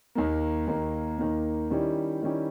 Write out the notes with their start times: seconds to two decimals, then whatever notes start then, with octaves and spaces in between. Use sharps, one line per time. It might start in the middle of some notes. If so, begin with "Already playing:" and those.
0.15 D#2 D#3 A#3
0.67 D#2 D#3 A#3
1.18 D#2 D#3 A#3
1.70 D#3 G3 C#4 E4 G4
2.22 D#3 G3 C#4 E4 G4